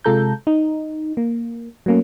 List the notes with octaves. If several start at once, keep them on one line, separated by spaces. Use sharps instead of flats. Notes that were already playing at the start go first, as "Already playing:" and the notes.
C3 G#3 F4 A4 A#5 G6
D#4
A#3
F#3 A3 A#3 C#4